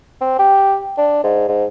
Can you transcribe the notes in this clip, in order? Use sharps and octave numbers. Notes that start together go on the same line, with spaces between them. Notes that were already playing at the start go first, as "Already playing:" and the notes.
C4
G4
D4
G#2
G#2